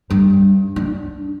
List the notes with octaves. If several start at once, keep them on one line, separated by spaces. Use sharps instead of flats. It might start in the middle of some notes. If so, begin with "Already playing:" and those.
G2
D4